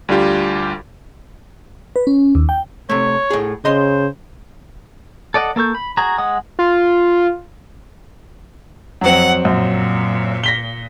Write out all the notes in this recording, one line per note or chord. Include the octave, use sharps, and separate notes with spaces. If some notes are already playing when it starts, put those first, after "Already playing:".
D2 G3 D4 F4 G4
B4
C#4
D#2
G5
C3 A3 C#5
A2 G#4
C#3 C5 D#5 C6
A4 D5 D#5 F#5
A#3 A4 C#6 G6
B5
F#4 G#4 A#5
G#3 F#5 D#6
F4
F2 F#3 C4 F#5
F#2 A#2
A#6 B6 G7